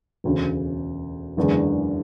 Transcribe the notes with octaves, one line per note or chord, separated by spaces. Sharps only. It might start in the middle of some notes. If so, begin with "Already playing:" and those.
E1 D2 C#3
F#1 E2 D3 G#3